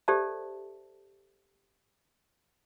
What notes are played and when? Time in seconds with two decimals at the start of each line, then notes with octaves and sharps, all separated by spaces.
0.08 G4 A4 C5 D5 E5 A5